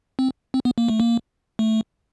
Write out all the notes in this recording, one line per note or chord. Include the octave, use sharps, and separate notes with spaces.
C4
C4
B3
A#3
A3
A#3
A3